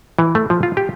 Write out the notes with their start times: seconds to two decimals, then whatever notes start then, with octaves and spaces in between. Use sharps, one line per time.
0.19 E3
0.35 A3
0.50 F3
0.63 F4
0.77 G4